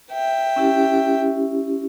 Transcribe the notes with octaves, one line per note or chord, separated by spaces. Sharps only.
E5 G5
C#4 E4 G4